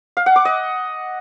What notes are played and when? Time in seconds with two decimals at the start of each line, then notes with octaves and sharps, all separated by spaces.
0.17 F5
0.26 F#5
0.36 D6
0.45 D#5